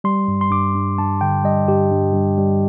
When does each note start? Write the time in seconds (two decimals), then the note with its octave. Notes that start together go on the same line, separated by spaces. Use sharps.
0.04 G3 C6
0.28 G2
0.41 C6
0.51 G2 D6
0.74 G2
0.98 G2 A5
1.21 D3 G5
1.44 G3 D#5
1.68 G2 G4
1.91 G2
2.14 G2
2.38 G3